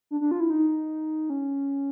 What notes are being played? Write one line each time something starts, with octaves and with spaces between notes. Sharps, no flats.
D4
D4
F4
E4
D#4
C#4